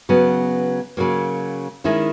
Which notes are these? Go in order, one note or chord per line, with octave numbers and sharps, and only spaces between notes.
C#3 F#3 B3
C#3 F#3 A#3
D#3 G#3 C#4 E4